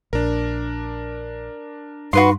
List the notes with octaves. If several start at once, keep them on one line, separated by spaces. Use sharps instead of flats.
A#1 D4 A#4
G2 D#4 F#4 B4 C6